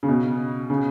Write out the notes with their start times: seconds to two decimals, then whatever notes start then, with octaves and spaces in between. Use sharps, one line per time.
0.03 C#3
0.08 B2
0.70 C#3